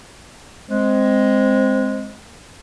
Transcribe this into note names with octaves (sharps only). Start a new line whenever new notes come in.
G#3 C4